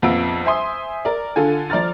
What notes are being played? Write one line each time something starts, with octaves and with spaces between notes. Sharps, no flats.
A#1 F2 B3 F4 E6 D7
C5 E5 G#5 C6 D#6
A#4 D5
D3 F4 A4 G#5
F3 D5 A#5 F6 A6